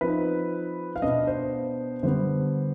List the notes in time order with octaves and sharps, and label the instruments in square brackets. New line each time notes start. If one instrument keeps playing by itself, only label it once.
[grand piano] F3 C4 D#4 B4
F5
B2 B3 D4 D#5
C5
D3 G3 B3 C5